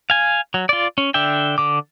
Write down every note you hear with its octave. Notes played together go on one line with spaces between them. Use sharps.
F5 G#5
F#3
F4 D5
C#4
D3 D4 E5 G5
D3 D6